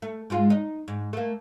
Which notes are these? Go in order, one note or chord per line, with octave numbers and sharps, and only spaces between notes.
A3
G#2 G#3 F4
D#4
G#2
A3 A#3